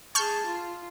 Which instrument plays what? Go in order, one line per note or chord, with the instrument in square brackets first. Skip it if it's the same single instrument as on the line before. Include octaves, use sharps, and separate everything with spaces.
[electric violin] G#4 A5 [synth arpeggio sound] C#6 F6 G6
[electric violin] F4